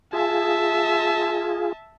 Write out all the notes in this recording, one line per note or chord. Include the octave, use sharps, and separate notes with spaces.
F4 G#4 E5 A5